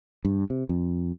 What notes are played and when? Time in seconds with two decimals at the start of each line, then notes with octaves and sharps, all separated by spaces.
0.25 G2
0.50 C3
0.69 F2